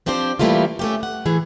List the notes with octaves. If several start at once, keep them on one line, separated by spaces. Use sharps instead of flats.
F3 C4 D4 G4 C5
E3 G3 A3 A#3 F4
A3 C#4 G4
F#5
A2 E3 G#4